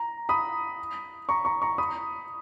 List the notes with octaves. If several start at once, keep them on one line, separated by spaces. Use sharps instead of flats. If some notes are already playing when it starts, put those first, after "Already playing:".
Already playing: A#5
B5 D#6
A#5 C#6
A#5 C#6
A#5 C#6
B5 D#6